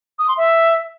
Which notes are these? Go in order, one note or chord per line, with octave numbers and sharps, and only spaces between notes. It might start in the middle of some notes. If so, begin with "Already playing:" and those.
D#6
C6
E5